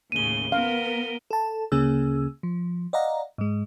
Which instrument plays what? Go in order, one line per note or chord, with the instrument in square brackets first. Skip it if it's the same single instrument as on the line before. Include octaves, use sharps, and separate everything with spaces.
[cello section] D#2 A2 C#3 [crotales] D#7 G7
[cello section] B3 A#4 [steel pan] F5
[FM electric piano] A4 A5
D2 C#3 A#3 C#4 G#4 E6
F3
D5 D#5 F5 F#5 A#5
G#2 G#3